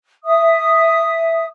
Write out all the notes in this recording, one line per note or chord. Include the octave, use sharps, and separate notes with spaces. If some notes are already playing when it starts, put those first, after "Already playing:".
E5 D#6